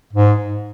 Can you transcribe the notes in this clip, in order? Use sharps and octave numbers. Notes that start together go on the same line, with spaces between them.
G#2